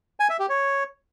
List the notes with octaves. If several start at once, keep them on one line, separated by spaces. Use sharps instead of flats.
G#5
E5
G4
C#5